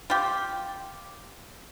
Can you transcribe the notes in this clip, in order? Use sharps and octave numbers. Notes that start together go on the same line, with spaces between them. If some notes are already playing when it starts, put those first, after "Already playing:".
F4 G4